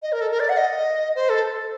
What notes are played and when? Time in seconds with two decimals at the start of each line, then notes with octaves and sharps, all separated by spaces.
0.03 D#5
0.12 A#4
0.21 A4
0.31 A#4
0.40 D5
0.49 F#5
0.58 D#5
1.15 C5
1.29 A4